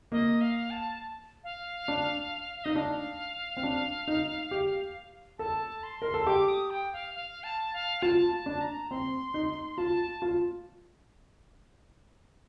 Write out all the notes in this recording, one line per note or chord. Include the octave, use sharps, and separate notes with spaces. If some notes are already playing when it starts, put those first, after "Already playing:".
A#3 D#5
F5
A5
F5
D4
D#4 D#5
D4 F5
C4
D4
D#4
G4
A4 A5
C6
A#4
A4
G4 D6
D#6
G5
F5
F5
A5
F5
F4 A5
A5
D4
A#5
C4 C6
D#4
F4 A5
F4